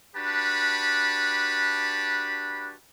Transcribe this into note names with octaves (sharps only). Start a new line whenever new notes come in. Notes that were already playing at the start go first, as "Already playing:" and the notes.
D4 F#4 G4 B4 A5 B5